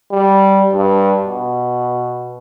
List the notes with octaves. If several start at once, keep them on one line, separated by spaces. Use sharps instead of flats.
G3
G2
B2